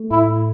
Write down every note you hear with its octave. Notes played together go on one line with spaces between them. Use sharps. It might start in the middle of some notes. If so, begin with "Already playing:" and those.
Already playing: A3
A2 E4